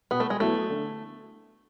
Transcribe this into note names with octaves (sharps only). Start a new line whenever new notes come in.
B2 B3
A3
G#3
F#3 A3 B3 E4 A4
D3